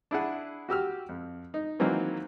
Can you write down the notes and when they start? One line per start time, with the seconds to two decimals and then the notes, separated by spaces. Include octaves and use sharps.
0.11 D4 E4 G#4 F#5
0.69 F#4 G4 E6 F6
1.09 F2
1.54 D#4
1.79 D#3 E3 F#3 A#3 C4 D#4